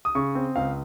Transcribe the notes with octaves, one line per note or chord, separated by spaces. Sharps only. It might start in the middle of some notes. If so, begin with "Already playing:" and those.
D#6
C#3 C#6
C4
C#2 F5